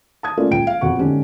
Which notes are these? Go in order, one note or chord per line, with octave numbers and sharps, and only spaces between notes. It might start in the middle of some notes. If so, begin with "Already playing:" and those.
A5 D#6 G#6
A3 A#3 C#4 F4 D5
D#1 C#2 G5 D7
F5
E1 F2 F#5 C#6
G#2 D3 C#4 G4